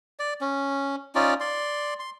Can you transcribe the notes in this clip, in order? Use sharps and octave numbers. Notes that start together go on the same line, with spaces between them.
D5
C#4
C#4 D#4 F4 D5
D5 C6
C6